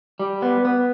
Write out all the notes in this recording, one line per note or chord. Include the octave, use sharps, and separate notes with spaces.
G3
B3
B3